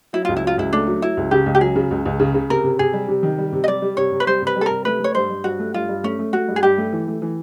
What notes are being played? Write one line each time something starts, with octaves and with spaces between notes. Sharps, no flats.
F#3 E4
C#2 F4
E4
F#3 F4
C#2 E4
A3 D4
F#3
F#3 E4
C#2
C#3 G4
C#2
G4
F#3 G#4
C#3
C#2
C#2
C#3
C#3
C3 A#4
C3
C3 G#4
G3
C3
D#3
G3
C3
D#5
G3 D5
G3
C3 C#5
C3
B4
G3 C5
C3 B4
G3
A4
C3 A#4
A3 B4
A3 C#5
G2 C5
G2
G2 F#4
A3
G2 F4
G2
A3 C#4
A3
A3 F#4
G2
G#4
G2 G4
A3
E3
A3
E3